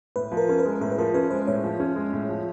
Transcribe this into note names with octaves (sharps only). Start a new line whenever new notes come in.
A2 B4
F3
A#4
C#4 A#4
B4
G#3
A2 A#4
B4
F3 A#4
C#4 B4
G#3 C5
A2 C#5
F3
C#4
G#3
A2
F3